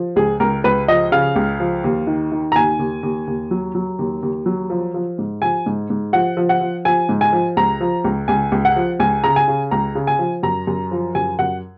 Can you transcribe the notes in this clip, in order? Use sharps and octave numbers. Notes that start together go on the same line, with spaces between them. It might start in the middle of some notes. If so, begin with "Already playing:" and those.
Already playing: F3
C#2 G#4
C#2 A#4
C#2 B4
F3 D#5
C#3 F5
C#2
F3
D#2
D#3
D#3
A#5
D#2 G#5
D#2
D#2
D#2
F#3
F#3
D#2
D#2
F#3
F3
F3
G#2
F3 G#5
G#2
G#2
F3 F#5
F3
F#5
F3
F3 G#5
G#2
G#5
F3
C#2 A#5
F3
C#2
C#2 G#5
C#2
F#5
F3
C#2 G#5
C#3 A#5
G#5
C#3
C#2 A#5
C#3
G#5
F3
F#2 A#5
F#2
F3
F#2 G#5
F#2 F#5